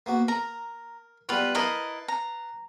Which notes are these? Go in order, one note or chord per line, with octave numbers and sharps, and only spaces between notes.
A#3 B3 F#4
A#4 A#5
G3 B3 F4 B4
E4 A#4 B4 D#5 F5 A5
A#5